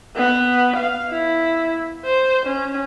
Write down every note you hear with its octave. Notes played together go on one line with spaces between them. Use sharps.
B3
F5
E4
C5
C#4